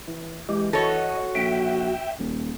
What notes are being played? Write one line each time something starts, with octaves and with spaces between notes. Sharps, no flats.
E3
E3 G#3 G4
F#4 A4 C#5 D#5
A#1 E5 G5
D#1